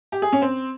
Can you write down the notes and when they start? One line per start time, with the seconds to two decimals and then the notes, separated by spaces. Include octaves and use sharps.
0.12 G4
0.22 G#4
0.32 C#4
0.42 C4